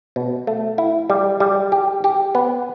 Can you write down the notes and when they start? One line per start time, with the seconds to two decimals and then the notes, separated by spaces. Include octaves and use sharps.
0.16 B2
0.47 A3
0.78 E4
1.10 G3
1.40 G3
1.72 G4
2.04 G4
2.35 B3